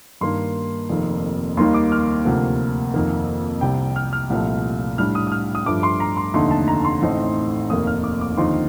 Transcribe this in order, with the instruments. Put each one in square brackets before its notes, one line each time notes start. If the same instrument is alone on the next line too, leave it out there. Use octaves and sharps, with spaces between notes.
[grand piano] G2 D#3 A#3 C6
F1 F2 D#3 A#3
D#2 D#3 G3 A#3 D#4 C6
D6
F6
D2 C3 F3 A#3
F2 D#3 A#3
C2 C3 G3 G5
F6
F6
C2 A#2 F3 A3
A2 G3 D4 F6
D#6
D#6
F6
D#6
G2 F3 A3 D4 D6
C6
A#5
C6
F1 D#2 D3 A3 D#4 C6
A5
A#5
C6
A1 A2 A3 C4 D#4
F1 D#2 D#3 A#3 D#6
F6
D6
D6
D#2 D3 F3 C4 D#4 C6